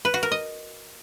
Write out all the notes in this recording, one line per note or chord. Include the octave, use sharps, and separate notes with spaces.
B4
F#4
A#4
D#5